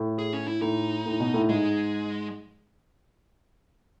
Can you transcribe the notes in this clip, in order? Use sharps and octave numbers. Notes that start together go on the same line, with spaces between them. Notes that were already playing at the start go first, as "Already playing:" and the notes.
Already playing: A2
G#4
C#4
E4
A2 D#4
A2
B2
A2
G#2 G#3